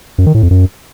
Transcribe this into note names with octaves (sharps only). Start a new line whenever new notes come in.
F#2
D#3
A2
F2
F#2